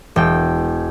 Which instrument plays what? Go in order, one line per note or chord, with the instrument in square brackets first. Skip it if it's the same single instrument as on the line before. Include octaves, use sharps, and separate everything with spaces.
[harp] E1 G5